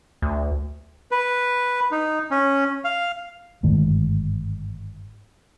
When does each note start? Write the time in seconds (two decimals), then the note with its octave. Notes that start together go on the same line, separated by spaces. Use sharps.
0.22 D2
1.11 B4
1.92 D#4
2.31 C#4
2.85 F5
3.63 G1 G#2 D#3 A3